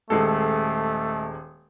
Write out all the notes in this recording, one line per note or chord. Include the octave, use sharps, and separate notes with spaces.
D#1 G#3 A3 A4